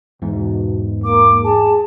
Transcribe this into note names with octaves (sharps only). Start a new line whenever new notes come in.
E2 G#2 B2
A#3 D6
G#4 A5